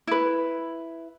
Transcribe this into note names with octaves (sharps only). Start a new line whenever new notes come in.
E4 B4